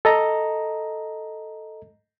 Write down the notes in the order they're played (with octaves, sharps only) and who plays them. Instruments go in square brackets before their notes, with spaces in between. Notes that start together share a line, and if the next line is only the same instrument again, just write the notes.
[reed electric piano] A4 D#5 A#5